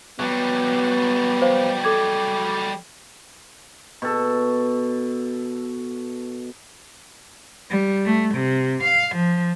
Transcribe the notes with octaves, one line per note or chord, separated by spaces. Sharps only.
F#3 G3 B3
C5 F5
A4 D6 G#6
B2 A4
G3
A3
C3
F5
F3